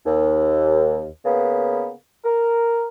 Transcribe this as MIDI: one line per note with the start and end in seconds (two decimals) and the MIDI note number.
0.06 1.05 39
1.25 1.89 49
1.25 1.89 58
1.25 1.89 59
2.25 2.87 70